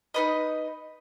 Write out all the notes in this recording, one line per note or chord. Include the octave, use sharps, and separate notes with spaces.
D#4 B4 D#5